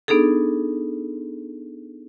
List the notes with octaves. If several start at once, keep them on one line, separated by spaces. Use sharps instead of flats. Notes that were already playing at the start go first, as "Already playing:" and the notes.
B3 D4 D#4 G#4 A4